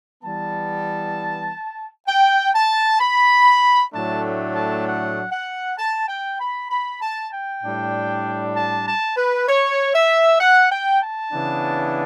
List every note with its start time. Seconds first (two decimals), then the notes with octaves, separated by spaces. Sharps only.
0.23 E3 G3 B3 A5
2.08 G5
2.55 A5
3.00 B5
3.93 A2 F#3 A3 D4 A5
4.55 A5
4.86 F#5
5.31 F#5
5.78 A5
6.08 G5
6.40 B5
6.70 B5
7.01 A5
7.32 G5
7.63 A2 G3 D4
8.55 A5
8.87 A5
9.17 B4
9.48 C#5
9.95 E5
10.40 F#5
10.71 G5
11.01 A5
11.32 C#3 E3 B3 D4